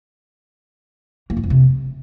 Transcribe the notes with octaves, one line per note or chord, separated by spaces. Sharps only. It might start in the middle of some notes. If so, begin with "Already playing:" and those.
A#3
F#2
F2
C3